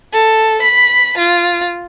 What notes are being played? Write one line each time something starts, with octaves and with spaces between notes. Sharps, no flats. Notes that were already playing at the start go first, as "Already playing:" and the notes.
A4
B5
F4